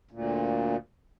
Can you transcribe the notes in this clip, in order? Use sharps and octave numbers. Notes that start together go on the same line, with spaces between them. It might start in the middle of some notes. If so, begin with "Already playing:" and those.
D2 A#2